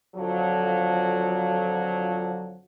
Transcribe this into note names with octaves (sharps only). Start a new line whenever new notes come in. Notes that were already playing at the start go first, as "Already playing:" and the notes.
F2 D3 F3 F#3